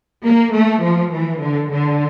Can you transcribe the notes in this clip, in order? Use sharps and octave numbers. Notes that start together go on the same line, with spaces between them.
A#3
A3
F3
E3
D3
D3